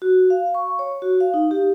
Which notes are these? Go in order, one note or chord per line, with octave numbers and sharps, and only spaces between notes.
F#4
F5
C#6
C#5
F#4
F5
D#4
G4